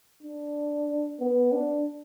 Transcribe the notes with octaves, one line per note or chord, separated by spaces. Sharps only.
D4
B3
D4